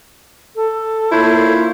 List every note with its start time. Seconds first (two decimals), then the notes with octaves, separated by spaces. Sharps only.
0.56 A4
1.12 A#3 D4 E4 F4 C5 C#5